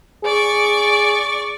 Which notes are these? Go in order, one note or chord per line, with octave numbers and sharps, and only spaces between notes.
G#4 D5 C#6